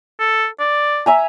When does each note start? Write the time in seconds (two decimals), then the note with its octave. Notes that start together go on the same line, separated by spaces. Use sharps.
0.20 A4
0.60 D5
1.06 E5 G#5 A#5